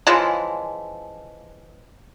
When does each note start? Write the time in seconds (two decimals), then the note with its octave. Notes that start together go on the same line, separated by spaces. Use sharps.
0.07 C#3 E3 F3 G#3